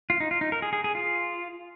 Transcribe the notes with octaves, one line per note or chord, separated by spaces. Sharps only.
F4
D#4
F4
D#4
A#4
G#4
G#4
G#4
F4